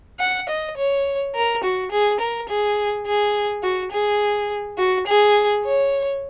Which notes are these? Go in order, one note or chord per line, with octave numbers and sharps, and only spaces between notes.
F#5
D#5
C#5
A#4
F#4
G#4
A#4
G#4
G#4
F#4
G#4
F#4
G#4
C#5